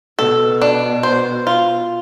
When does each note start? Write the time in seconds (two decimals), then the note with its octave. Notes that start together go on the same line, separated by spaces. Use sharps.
0.18 B2 A4
0.62 D4
1.03 C5
1.47 F4